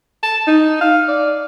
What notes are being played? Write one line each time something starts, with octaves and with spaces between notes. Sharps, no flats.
A5
D#4
F5
D5